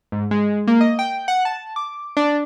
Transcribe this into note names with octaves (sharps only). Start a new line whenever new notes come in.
G#2
G#3
A#3
D#5
G5
F#5
A5
D6
D4